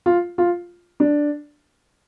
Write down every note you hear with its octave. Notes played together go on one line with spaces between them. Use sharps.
F4
F4
D4